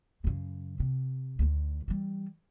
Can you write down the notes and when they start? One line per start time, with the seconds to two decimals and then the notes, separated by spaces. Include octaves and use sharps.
0.24 F#2 C#3
0.80 C3
1.39 D2 D#3
1.88 E3 G3